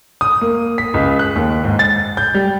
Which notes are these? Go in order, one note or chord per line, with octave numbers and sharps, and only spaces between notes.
D#6
A#3
B6
C#2
F#6
D#2
G#2
A6
G6
G3